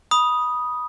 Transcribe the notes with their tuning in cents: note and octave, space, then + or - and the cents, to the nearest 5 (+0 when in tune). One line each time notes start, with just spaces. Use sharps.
B5 -15 D#6 +0